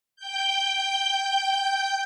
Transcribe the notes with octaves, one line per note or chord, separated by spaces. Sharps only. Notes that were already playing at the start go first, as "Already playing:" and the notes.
G5 G6